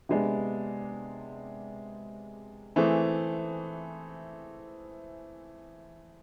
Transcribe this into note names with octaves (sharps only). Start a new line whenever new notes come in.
C3 G#3 B3 D4
E3 A3 C4 G#4